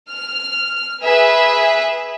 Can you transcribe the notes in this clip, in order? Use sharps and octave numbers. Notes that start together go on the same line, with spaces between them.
F6
G#4 B4 E5